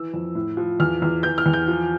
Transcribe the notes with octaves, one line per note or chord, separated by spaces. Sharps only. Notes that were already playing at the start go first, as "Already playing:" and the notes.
Already playing: E3 E6
F2
A2
F3
E2 F6
E2
E3 G6
F6
E2
G6
F3